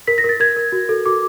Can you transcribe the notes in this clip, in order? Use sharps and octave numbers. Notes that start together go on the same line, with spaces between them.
A#4 B6
A#6
A#4 A6
A#4 G#6
A#4
F#4
A4
F#4 D6